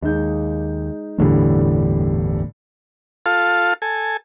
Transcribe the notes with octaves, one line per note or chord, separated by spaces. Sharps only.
D#2 G#3 D#4 G6
G1 E2 A2 D3 E3 G3
F4 A4 F5
A4 G#5